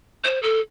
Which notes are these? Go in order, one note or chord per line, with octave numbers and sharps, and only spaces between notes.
C5
A4